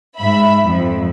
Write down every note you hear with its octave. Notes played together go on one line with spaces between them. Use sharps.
G#2 E5 B5
F2